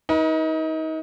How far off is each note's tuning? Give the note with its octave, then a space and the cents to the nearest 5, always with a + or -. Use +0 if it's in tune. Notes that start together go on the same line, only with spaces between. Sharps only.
D#4 +30 B4 -45